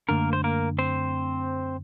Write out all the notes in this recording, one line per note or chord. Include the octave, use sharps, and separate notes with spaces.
F#2 D3 A3 A#3 D4 A#4
C5
A#3 A#4
C4 C5